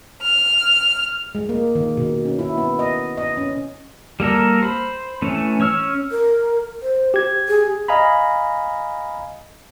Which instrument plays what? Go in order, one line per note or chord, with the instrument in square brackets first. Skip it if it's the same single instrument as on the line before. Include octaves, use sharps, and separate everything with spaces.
[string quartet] F6
[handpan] G#3
A#3
D#3
B2
C#4
E4
B3
D#5
D#5
C#4
[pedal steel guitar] G3 A#3 A4 A#4
C5 B5
E3 A3 C#4
C#4 C#5 E6 F6
[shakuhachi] A#4
C5
[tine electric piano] G4 G#6
[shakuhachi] G#4
[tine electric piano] D#5 F5 G#5 A#5 B5